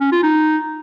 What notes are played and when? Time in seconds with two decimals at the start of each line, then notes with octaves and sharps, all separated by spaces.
0.01 C#4
0.12 F4
0.23 D#4